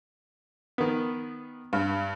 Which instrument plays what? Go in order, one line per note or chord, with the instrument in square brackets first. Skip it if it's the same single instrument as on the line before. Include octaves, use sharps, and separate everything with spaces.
[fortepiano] D#3 B3
[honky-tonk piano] G2